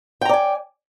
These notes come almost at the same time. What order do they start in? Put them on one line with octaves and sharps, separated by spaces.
G5 A#5 D5 G#5